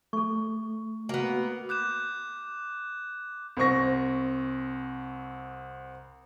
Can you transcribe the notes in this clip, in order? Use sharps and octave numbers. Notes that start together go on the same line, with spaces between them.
A3 A4 C#6
A#3 B3 F#4
D6 F#6 G6 E7
C2 C4 C#6 A#6